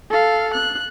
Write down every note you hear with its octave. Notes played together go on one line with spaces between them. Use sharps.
A4 F5
F#6